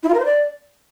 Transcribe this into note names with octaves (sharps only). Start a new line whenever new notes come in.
E4
F4
A#4
C5
D5